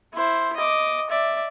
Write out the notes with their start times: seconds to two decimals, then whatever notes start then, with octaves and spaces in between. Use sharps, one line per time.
0.14 E4 C5
0.56 D#5 D6
1.10 D5 E5